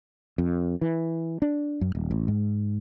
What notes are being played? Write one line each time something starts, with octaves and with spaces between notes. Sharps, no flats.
F2
E3
D4
F#2
D#1
A1
G#2